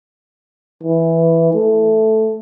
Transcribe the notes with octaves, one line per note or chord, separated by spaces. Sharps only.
E3
A3